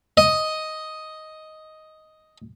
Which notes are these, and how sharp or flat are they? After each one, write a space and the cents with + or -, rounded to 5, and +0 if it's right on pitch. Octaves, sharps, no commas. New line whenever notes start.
D#5 +5